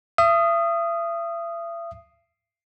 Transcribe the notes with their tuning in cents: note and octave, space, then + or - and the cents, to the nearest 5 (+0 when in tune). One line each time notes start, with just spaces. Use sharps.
E5 +40 D#6 -5